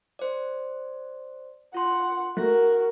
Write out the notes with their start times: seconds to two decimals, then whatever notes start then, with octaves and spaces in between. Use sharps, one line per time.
0.19 C5 D5
1.74 F4 F#5 C6
2.37 A3 F#4 A#4 F#6 A#6